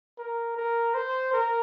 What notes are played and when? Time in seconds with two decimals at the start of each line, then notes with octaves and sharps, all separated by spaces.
0.18 A#4
0.56 A#4
0.94 C5
1.33 A#4